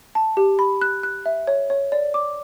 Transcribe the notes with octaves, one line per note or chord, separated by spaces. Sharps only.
A5
G4
B5
F#6
F#6
E5
C#5
C#5
D5
D6